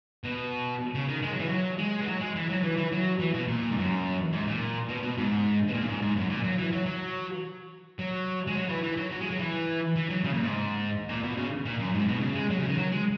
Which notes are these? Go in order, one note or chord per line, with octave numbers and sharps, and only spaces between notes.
B2
C#3
D#3
G#3
F#3
E3
F#3
G#3
E3
F#3
G#3
E3
F#3
E3
E3
F#3
E3
B2
A#2
G#2
F#2
G#2
A#2
B2
B2
G#2
B2
A#2
F#2
G#2
G#2
F#2
A#2
F#3
E3
F#3
F#3
F#3
G#3
F#3
E3
E3
F#3
F#3
G#3
F#3
E3
E3
F#3
C#3
A#2
G#2
A#2
B2
C#3
A#2
F#2
G#2
B2
C#3
G#3
F#3
C#3
D#3
F#3
G#3